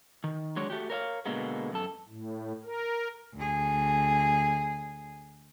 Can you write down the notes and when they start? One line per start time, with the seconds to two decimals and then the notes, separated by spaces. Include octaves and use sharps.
0.24 D#3
0.56 F#3 G#3 D4 C#5
0.70 A3 F#4 G4
0.90 A#4 C#5 E5 F5
1.25 B2 D3 G#3 A#3 B3
1.72 F#2 A4
2.08 A2
2.64 A#4
3.35 D2 G#4